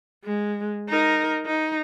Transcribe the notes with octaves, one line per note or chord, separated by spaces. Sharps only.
G#3
D#4 A#4
D#4